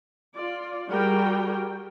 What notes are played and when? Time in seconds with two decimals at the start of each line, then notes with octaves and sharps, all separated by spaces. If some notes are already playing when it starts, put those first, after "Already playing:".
0.35 F4 D5
0.89 G3 F#4 G#4 A#4 G5